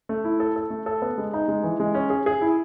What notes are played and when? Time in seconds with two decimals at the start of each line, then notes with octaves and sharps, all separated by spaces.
0.09 A3
0.25 E4
0.40 A4
0.56 A4
0.70 A3
0.86 A4
1.02 B3
1.18 G#3
1.33 D#4
1.48 G#3
1.64 E3
1.80 G#3
1.94 C#4
2.10 G#4
2.26 G#4
2.41 E4